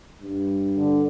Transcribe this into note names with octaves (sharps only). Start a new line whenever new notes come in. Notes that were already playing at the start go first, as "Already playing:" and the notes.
G2
D3